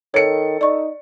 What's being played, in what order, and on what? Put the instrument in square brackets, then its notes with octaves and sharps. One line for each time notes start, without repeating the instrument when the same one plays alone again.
[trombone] D#3 [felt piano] A4 C#7 [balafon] C#5
[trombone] D#4 [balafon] D5 C#6